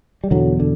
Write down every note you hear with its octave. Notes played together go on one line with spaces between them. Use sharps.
G3
E2 B2 D3 F#3
D3